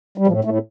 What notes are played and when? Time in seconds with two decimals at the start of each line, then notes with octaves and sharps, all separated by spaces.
0.18 G3
0.27 A2 F3
0.44 A2 A3